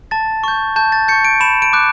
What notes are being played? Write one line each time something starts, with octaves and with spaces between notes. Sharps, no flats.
A5 A6
C#6 G6
A5 G6
A6
C#6 G6 C#7
D7
B5 E7
D7
D6 F#6